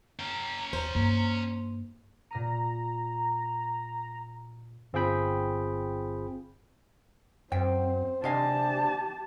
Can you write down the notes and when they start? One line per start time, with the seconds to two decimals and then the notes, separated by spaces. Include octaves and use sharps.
0.19 C#4 G5 A#5
0.73 D#2 C5
0.95 G2 A#3
2.31 A#2 A#5 F6 D#7
4.93 G1 C4 F4 G#4 G5 B5
7.52 F#2 C4 C5 G5
8.24 C3 D4 G4 D#5 F5 G#5 A5